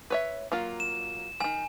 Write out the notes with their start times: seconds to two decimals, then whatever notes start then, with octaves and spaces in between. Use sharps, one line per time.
0.10 B4 C#5 E5
0.52 F#3 A#3 F4
0.80 E7
1.40 D#3 F3 G#5